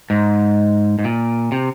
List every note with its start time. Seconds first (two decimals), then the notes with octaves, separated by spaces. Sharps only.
0.10 G#2
0.99 G#2
1.04 A#2
1.52 C3